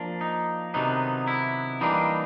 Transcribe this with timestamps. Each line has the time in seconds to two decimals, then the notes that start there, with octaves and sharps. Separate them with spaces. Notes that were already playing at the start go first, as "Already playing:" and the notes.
Already playing: F3 A#3 D4
0.21 D#4
0.74 C3 D#3 F#3 B3 D4 D#4
1.28 E4
1.81 E3 G3 A#3 D4 D#4